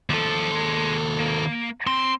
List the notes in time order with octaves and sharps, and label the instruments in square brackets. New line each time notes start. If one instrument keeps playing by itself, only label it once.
[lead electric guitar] D#2 A4 [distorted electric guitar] F3
[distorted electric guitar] G#4 C6
A#3
[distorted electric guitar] C4 [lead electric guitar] C6